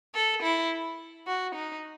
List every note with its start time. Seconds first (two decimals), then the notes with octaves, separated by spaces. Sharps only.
0.15 A4
0.43 E4
1.27 F#4
1.55 D#4